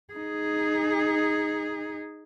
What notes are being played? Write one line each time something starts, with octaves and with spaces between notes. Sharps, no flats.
D#4 G#4